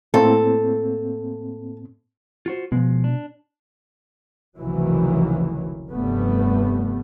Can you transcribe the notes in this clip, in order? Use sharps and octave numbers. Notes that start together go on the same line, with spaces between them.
A2 A#3 C4 A4
F4 F#4 C5
B2 F3 G#3
D4
F1 C#2 D#3 E3 F#3
F1 G2 G3 A3 B3